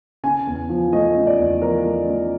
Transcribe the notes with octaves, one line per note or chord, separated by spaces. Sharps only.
C#3 G#5
E2
F3
A3 D#5
C#3
D5
E2
F3 A#4
A3
C#3